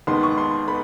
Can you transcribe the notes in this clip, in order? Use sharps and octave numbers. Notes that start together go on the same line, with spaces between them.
D#2 D#3 G#3 B3 C6
C#6
C6
B3 B5